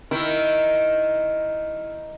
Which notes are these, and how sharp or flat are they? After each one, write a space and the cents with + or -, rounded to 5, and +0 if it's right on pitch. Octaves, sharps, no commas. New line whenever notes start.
D#3 +0 E4 +0 A#4 +0